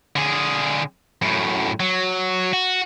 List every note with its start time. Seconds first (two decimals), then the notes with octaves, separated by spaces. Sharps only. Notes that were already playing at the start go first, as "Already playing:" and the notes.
0.16 D3 G#4
1.22 F#2 A2
1.80 F#3
2.53 F#4